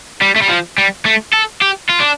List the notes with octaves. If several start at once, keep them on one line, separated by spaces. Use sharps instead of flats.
G3
A3
G3
F3
G3
A3
A4
G4
F4
D4